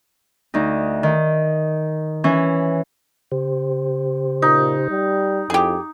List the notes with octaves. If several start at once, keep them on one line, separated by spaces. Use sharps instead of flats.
D2 D#4
D#3
E3 C#4
C#3 G4 C5
A#2 D#4
G3
F2 E4 G4 G#4